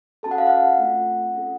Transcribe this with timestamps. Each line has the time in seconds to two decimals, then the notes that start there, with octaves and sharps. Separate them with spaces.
0.23 C#4 F#4 A4 A5
0.31 F#5
0.38 F5
0.47 F#5
0.78 A3 C4 F4 A4
1.34 C#4 F4 A4